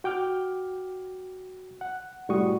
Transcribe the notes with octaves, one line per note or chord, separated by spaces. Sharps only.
F#4 G5 D6 F6 G6
F#5
C2 A2 G3 F#4 C#6 D#6